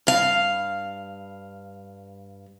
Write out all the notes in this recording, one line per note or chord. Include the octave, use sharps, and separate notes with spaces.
G2 F5